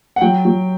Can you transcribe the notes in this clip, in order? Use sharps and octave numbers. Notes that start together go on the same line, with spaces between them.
F#5
F#3 G5
F#3